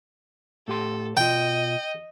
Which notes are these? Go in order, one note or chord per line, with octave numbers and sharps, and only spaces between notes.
A2 G4 A4 C6
B2 F4 D#5 G5